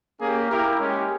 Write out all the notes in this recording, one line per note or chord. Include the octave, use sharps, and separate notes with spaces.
A#3 C#4 G4 G#4
A#3 E4 G4 A#4
G#3 C#4 G4